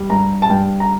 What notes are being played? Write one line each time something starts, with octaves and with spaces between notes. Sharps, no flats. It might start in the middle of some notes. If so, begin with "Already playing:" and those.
Already playing: G3
G2 A#5
A5
G2 G5
A#5